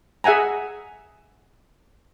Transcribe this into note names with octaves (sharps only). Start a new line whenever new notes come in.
G#4 E5 F#5 G#5 A#5